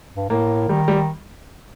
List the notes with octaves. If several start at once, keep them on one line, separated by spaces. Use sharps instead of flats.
G2
A2 A#3
D#3 G3
G3